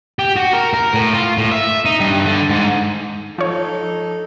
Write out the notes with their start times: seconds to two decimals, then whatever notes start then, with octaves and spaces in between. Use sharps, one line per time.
0.19 G4
0.36 F#4
0.53 A#4
0.74 A#4
0.94 A2
1.13 F4
1.38 A2
1.51 E5
1.85 D#4
2.00 G2
2.25 D3
2.50 G#2
3.38 F3 D#4 A4 C#5